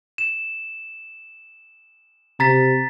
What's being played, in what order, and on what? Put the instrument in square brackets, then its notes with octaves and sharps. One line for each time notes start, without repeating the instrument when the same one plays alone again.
[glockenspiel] E7
[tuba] C3 [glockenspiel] A#5 A6 B6